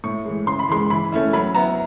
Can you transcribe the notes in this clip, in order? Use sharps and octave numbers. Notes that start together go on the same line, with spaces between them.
A2 C#6
E3 G#3
C#3 C6
B5
E3 G#3 C6
E3 B5
A3 C#4 E4
F#3 B5
B3 E4 A#5